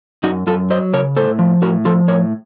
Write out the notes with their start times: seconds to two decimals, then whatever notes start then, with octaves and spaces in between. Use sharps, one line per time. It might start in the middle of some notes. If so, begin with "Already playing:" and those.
0.23 F#2 D#4 F#4
0.47 F#2 F4 A4
0.70 F#3 C5 D#5
0.93 C#3 A#4 C#5
1.16 A2 A4 C5
1.39 F3
1.62 A2 F#4 A#4
1.85 F3 F4 A4
2.08 A2 A#4 C#5